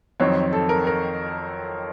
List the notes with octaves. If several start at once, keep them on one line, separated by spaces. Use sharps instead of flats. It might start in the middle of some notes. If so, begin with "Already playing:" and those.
F2 D#3 F#3 C4 C#5
A4
A#4
A#4